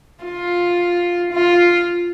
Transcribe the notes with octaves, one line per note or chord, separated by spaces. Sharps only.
F4
F4